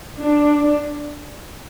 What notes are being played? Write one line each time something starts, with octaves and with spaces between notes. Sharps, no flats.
D4